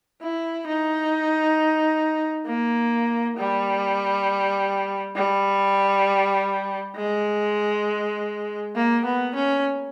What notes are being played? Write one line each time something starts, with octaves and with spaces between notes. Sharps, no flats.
E4
D#4
A#3
G3
G3
G#3
A#3
B3
C#4